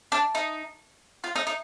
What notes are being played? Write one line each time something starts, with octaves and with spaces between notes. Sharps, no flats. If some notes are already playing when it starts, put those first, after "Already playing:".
D4
D#4
F4
D#4
D#4